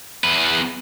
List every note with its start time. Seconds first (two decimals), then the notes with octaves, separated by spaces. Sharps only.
0.24 E2 B4